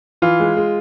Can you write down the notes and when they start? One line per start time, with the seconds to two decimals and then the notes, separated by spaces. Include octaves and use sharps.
0.22 E3 F4
0.40 G#3
0.57 G#3